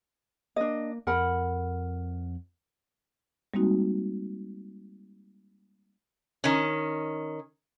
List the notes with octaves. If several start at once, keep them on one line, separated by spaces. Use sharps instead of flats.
A#3 D4 D#5
F2 A#4 F#5 B5
G3 G#3 A#3 C4 D#4 F#4
D#3 C#4